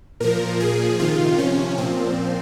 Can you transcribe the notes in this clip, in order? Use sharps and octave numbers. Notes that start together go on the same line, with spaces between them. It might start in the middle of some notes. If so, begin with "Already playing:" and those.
A#2 F3 A#4
A#2 F3 G#4
C3 D#3 F4
C3 F3 C#4
A#2 F3 C4